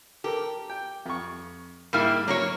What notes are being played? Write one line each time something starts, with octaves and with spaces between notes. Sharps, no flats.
G4 A4 A#4
G5
F2 C#6
G#2 G3 A#3 E4 F6
F#3 A#3 E4 A#4 C#5